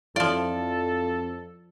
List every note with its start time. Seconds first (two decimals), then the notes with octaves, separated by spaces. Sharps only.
0.16 F2 F3 E4 A4 D5 F5